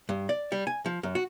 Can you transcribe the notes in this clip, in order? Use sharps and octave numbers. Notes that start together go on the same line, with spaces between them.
G2
D5
G3
G#5
F3
F#2
F#4